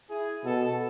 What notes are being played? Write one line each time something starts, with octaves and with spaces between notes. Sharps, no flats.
E4 G#4
B2 F#4 A4